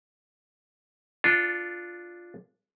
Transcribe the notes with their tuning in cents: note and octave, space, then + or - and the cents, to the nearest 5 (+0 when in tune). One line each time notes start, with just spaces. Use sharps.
D4 +0 F4 +0 A4 +0